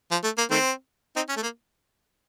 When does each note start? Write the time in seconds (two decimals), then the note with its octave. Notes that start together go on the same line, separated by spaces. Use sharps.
0.11 F3
0.24 A3
0.38 A#3
0.51 D#3 A3 C4
1.16 C4 D#4
1.29 C#4
1.36 A3
1.43 A#3